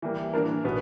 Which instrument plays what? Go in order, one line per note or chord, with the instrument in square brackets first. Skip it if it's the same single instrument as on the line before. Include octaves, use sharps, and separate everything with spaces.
[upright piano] E3 G3 A#3
E3 A#3 D4 A#4
[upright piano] B2 [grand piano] B3